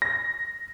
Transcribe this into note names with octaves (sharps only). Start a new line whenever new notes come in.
A#6